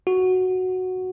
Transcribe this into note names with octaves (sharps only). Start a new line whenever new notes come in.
F#4